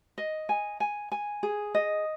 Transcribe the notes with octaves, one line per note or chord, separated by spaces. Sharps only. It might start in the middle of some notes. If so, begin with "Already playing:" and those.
D#5
G#5
G#5
G#5
G#4
D#5